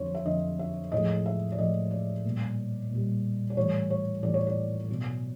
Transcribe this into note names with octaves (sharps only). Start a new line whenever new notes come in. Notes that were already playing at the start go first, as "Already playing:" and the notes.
Already playing: F2 D3 F#3 C5 C#5
E5
F2 D3 F#3 D#5
E5
A2 F3 G#3 D#5
E5
D5
A2 F3 G#3 D#5
D5
A#2 G3
A#2 G3
D5
A2 E3 G3 C#5
C#5
A2 E3 G3 D5
C#5
D5
B2 F#3